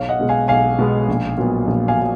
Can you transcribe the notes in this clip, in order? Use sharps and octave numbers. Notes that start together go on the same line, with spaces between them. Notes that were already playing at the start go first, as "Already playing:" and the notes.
Already playing: B1 C#5 F5
D#5 F#5
B2 G#3 B3
F5 G#5
B1 F5 G#5
B2 G#3 B3
A#1
A#2 F#3 B3
A#1
F5 G#5
A#2 F#3